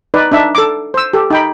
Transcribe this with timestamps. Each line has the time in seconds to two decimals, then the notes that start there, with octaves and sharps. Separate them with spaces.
0.14 D#4 B4 D5
0.32 D4 D#4 E5
0.55 A4 D6
0.94 C5 E6
1.13 G4 A4
1.30 D#4 G5 B5